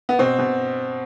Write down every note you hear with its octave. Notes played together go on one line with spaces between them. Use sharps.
B3
B2 C4
B2